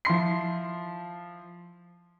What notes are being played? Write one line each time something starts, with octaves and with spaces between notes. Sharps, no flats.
F3 E4 C6 C7